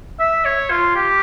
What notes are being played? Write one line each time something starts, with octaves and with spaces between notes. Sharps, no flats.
E5
C#5
F4
G4